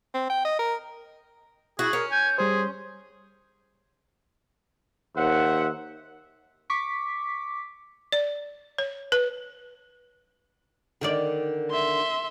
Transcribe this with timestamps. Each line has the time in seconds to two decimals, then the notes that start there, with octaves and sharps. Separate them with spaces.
0.14 C4
0.30 G5
0.45 D#5
0.59 A#4
1.79 E4 F#4 G#4
1.93 C#4 A#4
2.12 G#5 G6
2.38 G3 G#4 C5 C6
5.17 D#2 C5 E5 F#5
6.70 C#6 D6 B6
8.12 D5
8.78 C#5
9.12 B4
11.01 D3 D#3 D5
11.71 E5 C6